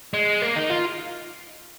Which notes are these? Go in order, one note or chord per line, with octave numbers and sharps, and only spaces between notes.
G#3
A#3
D#4
F4